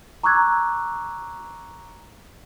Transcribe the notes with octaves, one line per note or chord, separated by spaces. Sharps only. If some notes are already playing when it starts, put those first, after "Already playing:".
A#5 C#6 D6 E6 F#6 G#6